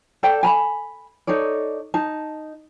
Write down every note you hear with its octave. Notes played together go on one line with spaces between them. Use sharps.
A4 C5 D5 G5
G#5 A#5 B5
D#4 A4 C#5 D5
D#4 A5